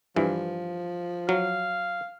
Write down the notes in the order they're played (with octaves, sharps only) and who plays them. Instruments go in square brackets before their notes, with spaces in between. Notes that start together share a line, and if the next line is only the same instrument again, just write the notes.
[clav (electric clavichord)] G2 E3 [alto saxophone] F3
[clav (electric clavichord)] F#3 [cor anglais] F5